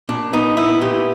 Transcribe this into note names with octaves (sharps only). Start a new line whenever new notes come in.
A#2 D4
B3 D#4
B3 E4
A#2 G4